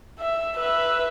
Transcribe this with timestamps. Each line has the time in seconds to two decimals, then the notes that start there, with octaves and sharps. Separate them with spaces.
0.19 E5
0.56 B4 E5